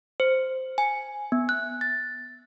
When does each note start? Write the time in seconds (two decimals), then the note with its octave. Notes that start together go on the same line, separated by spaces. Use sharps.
0.20 C5
0.78 G#5
1.32 B3
1.49 F#6
1.81 A6